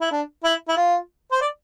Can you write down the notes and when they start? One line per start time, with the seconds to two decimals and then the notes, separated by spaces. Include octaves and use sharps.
0.01 E4
0.11 D4
0.44 E4
0.69 E4
0.76 F4
1.32 C5
1.41 D5